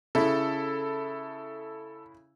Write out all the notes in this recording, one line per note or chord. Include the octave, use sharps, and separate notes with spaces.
C#3 E4 A4